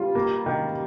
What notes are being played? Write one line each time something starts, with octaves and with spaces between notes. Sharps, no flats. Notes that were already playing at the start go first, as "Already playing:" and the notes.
Already playing: G3 F4
A#3
D#3